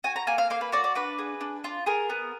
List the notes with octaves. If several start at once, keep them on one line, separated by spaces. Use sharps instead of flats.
F#4 G#5
A#5
A#3 G#5
F5
A#3 F5
B4
F#4 D5
D5
D4 B4
G#4
D4
F4
G#4 A#4
B3